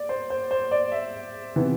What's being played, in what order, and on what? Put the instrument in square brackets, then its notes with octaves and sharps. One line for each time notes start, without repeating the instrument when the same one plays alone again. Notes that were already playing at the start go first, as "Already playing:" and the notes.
Already playing: [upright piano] D5
C5
C5
C5
D5
E5
C3 E3 B3